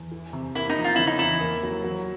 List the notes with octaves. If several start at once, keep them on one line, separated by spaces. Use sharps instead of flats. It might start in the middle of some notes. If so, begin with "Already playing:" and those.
Already playing: E2
E3
C3
A#3 E4
D#4
F3
F4
C#3 E4
D#4
E2 E4
A#3
F#3
F#3